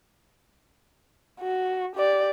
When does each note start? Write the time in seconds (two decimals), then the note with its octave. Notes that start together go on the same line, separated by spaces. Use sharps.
1.41 F#4
1.96 G4 D5